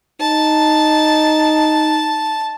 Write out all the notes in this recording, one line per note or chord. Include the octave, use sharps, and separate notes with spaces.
D#4 A5